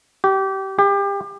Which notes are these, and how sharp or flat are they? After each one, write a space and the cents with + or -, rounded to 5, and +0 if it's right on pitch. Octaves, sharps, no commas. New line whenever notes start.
G4 -25
G4 +30